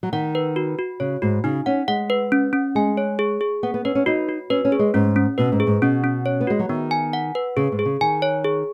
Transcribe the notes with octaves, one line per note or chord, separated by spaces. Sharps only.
F#3
D#3 F#5
B4
F#4
F#4
C#3 C#5
G#2 F#4
C#3 D#4
C#4 F#5
G#3 F#5
B4
C#4
C#4
G#3 G#5
C#5
G#4
G#4
B3 F#5
B3
C#4 B4
C#4
D#4 F#4
F#4
C#4 B4
C#4
G#4
G#3
G#2 C#4
C#4
B2 B4
G#2
G#4
G#2
B2 C#4
C#4
C#5
B3
G#3 F#4
F#3
D#3 B3
G#5
F#5
B4
C#3 G#4
G#2
G#4
C#3
D#3 G#5
C#5
G#4